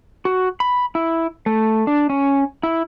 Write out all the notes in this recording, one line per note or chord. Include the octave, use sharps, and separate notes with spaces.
F#4
B5
E4
A3
D4
C#4
E4